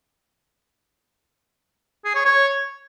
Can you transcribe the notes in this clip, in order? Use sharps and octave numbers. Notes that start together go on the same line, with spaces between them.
G#4
C#5
C#5